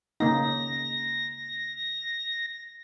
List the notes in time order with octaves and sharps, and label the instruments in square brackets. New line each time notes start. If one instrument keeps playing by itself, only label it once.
[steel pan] C#3 A#3 D#4 [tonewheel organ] A#6